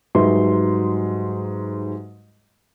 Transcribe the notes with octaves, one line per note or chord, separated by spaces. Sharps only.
G#2 F#3 G3 B4 E5 C6